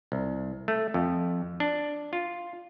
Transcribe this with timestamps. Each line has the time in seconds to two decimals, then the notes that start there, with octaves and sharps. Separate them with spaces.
0.12 C2
0.68 A3
0.94 F2
1.60 D4
2.13 F4